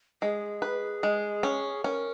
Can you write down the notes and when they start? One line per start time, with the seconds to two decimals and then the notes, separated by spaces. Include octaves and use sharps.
0.22 G#3 G#4
0.62 B4
1.03 G#3
1.43 C#4
1.84 C#4 A#4